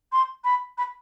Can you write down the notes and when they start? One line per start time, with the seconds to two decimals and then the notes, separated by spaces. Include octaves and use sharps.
0.12 C6
0.44 B5
0.78 B5